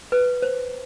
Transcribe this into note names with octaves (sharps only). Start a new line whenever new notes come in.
B4
C5